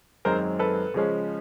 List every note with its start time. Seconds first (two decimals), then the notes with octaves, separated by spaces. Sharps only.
0.25 F#2 D#3 G#3 C4 A#4 C5
0.59 A4 B4
0.94 C#3 F3 G#3 C#4